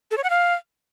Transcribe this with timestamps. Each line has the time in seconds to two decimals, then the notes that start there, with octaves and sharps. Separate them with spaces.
0.11 A4
0.17 C#5
0.24 F#5
0.30 F5